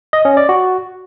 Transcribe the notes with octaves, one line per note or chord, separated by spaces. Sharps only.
D#5
C#4
D5
F#4